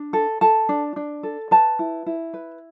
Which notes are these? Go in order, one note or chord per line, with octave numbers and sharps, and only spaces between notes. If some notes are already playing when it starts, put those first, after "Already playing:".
Already playing: D4
A4
A4 A5
D4
D4
A4
B4 A5
E4
E4
B4